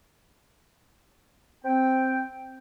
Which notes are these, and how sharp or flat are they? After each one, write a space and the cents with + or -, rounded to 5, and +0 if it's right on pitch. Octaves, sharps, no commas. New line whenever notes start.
C4 +0 G5 +0